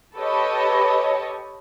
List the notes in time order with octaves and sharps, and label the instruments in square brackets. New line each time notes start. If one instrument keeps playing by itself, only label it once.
[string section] G4 A4 B4 C#5 D#5